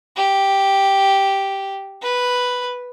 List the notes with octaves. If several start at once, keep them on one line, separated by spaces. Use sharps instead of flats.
G4
B4